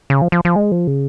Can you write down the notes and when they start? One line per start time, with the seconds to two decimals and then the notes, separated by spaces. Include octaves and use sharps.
0.10 C#3
0.22 F3
0.32 F3
0.45 F3
0.56 G#3
0.72 F3
0.87 C#3